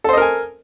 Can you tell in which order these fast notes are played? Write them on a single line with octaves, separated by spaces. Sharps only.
A4 C5 D#5 A#4 G#5